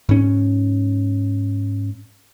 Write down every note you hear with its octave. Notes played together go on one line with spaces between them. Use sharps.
G#2 C#4